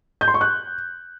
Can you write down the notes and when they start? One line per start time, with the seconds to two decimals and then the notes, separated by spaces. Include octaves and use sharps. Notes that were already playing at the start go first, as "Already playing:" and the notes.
0.21 G6
0.28 C6
0.34 C#6
0.41 F#6